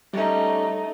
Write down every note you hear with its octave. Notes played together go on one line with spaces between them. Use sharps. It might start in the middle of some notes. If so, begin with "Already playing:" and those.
G3 A3 C#4 D#4